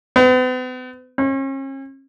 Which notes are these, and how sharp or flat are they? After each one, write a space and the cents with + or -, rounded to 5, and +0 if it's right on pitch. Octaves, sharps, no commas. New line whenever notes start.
B3 +45
C#4 -40